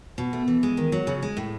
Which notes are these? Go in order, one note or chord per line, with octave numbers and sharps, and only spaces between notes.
B2
A3
E3
G#3
D#3
F#3
C#3
G#3
A2